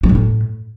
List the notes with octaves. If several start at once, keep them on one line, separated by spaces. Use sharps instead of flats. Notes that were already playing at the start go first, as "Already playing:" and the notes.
F#3
G#2
A2